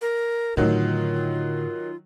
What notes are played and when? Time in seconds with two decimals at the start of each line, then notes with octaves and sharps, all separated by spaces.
0.01 A#4
0.57 A2 D3 D#3 F#3 F4